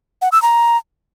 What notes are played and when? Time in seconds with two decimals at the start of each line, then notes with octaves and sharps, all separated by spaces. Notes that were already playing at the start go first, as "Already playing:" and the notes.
0.22 F#5
0.32 E6
0.42 A#5